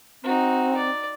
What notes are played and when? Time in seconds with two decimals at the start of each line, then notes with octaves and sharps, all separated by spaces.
0.24 C4 D#4 F#4
0.77 D5